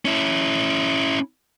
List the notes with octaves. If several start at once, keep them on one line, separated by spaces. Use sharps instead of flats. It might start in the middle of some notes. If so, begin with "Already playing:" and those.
C#4 E4